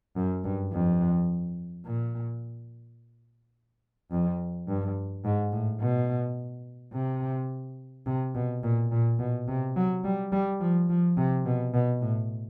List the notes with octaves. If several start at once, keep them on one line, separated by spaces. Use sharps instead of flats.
F#2
G2
F2
A#2
F2
G2
G#2
A2
B2
C3
C3
B2
A#2
A#2
B2
C3
F#3
G3
G3
F3
F3
C3
B2
B2
A2